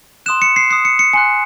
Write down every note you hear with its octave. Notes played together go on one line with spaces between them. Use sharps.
C6 D#6 F#6 E7
C#7
C7
C6 D#6 F#6 C7
C#7
C#7
G#5 C6 F#6 C#7